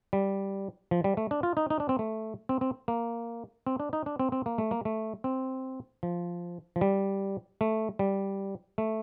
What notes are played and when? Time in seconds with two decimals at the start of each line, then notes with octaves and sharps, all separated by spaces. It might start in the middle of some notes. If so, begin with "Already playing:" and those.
0.13 G3
0.91 F3
1.04 G3
1.17 A3
1.31 D4
1.43 F4
1.57 D#4
1.70 D#4
1.80 D4
1.89 C4
1.99 A3
2.49 C4
2.61 C4
2.88 A#3
3.67 C4
3.80 D4
3.93 D#4
4.06 D4
4.20 C4
4.32 C4
4.46 A#3
4.58 A3
4.71 A#3
4.85 A3
5.24 C4
6.03 F3
6.76 F3
6.81 G3
7.61 A3
7.99 G3
8.78 A3